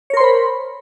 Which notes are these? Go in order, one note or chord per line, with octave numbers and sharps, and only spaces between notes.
A#4 C5 C#5 B5 C6